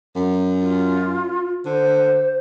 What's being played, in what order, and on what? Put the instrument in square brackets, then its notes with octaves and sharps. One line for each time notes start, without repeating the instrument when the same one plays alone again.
[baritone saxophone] F#2
[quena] F4
[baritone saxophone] D3 [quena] C5